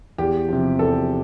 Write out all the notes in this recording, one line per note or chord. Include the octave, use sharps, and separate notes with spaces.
E2 G4
C3 F3
E2 A4